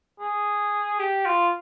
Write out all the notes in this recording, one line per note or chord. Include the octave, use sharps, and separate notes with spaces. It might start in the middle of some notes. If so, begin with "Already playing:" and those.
G#4
G4
F4